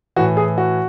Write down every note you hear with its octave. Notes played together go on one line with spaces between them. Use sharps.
A2 E3 F#4
G#4
F#4